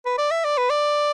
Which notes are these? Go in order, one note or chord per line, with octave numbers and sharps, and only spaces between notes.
B4
D5
E5
D5
B4
D5